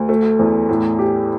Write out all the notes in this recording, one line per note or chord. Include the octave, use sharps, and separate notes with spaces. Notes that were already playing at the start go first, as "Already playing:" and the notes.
Already playing: D2
A3
E2
A2
G4